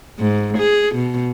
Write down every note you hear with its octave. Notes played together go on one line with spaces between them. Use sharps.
G#2
G#4
B2